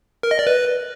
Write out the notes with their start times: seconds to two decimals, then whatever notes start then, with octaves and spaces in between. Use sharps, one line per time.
0.23 A#4
0.31 D#5
0.39 D5
0.47 B4